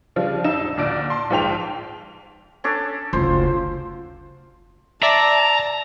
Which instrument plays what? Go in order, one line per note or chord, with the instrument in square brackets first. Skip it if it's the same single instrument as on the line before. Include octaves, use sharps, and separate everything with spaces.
[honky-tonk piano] C#3 F3 G3 D4
F2 D#4 E6 E7
A#1
D2 A#2 D5 D7
A5 C6
A#1 G#2 F3 G5 F7
[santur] C#4 D4 A4
[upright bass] F#1 D2 [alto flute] F4 [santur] C5
[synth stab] D5 E5 [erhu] A5 [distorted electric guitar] A#5